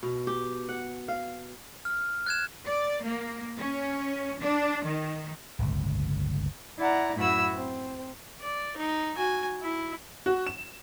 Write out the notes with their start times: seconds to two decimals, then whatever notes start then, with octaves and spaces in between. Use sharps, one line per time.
0.03 B2
0.27 G4
0.69 F#5
1.08 F5
1.85 F6
2.26 F#6 G#6 E7
2.66 D5
3.03 A#3
3.59 C#4
4.40 D4
4.85 D#3
5.59 D1 G1 C#2
6.79 E4 D5 F#5 A#5
7.16 F#2 A2 E4 F#4 B5 E6
7.53 C4
8.41 D5
8.77 D#4
9.16 F#4 G#5
9.62 E4
10.26 F#4
10.47 E7